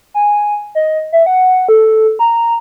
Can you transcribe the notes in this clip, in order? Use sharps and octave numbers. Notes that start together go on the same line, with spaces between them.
G#5
D#5
E5
F#5
A4
A#5